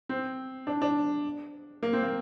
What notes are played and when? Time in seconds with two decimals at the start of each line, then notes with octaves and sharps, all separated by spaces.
0.09 C4
0.67 D4
0.82 D4
1.83 A#3
1.93 C4
2.03 A#3